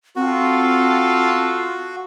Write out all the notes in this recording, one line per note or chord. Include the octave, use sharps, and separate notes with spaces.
C4 F4 F#4 A4